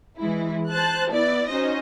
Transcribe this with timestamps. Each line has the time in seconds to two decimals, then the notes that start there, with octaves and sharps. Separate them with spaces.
0.18 E3 G#3 E4
0.70 C5 A5 F#6
1.11 B3 E4 D5
1.49 C#4 D#4 F#4 C5 D#5